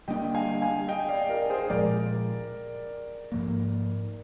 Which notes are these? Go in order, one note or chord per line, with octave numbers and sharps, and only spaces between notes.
D3 G3 A#3 D4 D#5 G5
F5 G#5
F5 G#5
D#5 G5
D5 F5
A#4 D5
G#4 C5
C5
A#2 F3 G#3 A#4 D5
G#2 F3 A#3